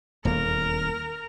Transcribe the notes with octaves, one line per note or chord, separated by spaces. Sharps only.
D#1 E2 A#3 A#4